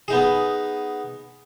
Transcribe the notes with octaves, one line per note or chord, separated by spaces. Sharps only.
B3 D#4 G#4